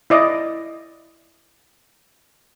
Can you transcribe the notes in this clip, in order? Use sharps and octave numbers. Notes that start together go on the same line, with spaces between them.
E4 D5 D#5